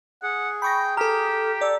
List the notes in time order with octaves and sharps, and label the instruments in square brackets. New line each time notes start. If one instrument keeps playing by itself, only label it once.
[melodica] G#4 [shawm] F#5
[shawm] G5 [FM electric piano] B5 C#6 A#6
[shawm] G4 [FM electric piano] A4 F6 [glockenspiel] A#5
[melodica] A4 [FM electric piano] D5